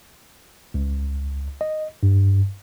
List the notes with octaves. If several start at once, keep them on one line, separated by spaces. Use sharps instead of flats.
C#2
D#5
G2